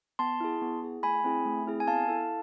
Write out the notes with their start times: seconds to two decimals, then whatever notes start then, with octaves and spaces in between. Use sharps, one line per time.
0.19 B3 A5 C6
0.41 E4 G#4
0.62 B3
0.82 E4 G#4
1.03 A3 G#5 B5
1.24 C4 E4 G#4
1.45 A3
1.66 C4 E4 G#4
1.80 G#5
1.87 B3 F5 A5
2.08 E4 A4